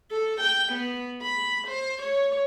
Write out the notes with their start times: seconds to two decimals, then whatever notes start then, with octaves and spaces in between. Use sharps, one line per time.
0.12 A4
0.41 G5
0.72 B3
1.22 B5
1.67 C5
2.02 C#5